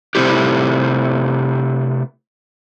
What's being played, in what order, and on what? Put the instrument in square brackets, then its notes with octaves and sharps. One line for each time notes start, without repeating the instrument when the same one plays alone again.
[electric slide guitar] C3 G3 A3 C4 E4 G4